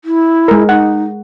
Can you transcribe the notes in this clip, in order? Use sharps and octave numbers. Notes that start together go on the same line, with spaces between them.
E4
G#3 A#4
D#4 F#5